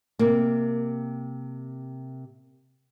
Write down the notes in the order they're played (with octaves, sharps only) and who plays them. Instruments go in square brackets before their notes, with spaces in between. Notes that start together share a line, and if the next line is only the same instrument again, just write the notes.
[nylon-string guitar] C3 A#3